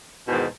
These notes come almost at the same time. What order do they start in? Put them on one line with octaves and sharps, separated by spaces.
E2 B2 G#2 D#3